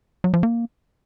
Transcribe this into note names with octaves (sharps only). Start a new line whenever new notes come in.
F#3
F3
A#3